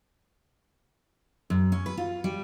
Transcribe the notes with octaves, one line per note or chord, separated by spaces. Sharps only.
F#2
C#4
B4
F4
G3